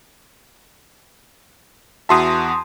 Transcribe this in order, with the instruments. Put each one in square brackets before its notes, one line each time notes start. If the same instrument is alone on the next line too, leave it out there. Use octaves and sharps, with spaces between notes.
[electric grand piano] E2 F#4 E5 [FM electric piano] A5 C6 D#6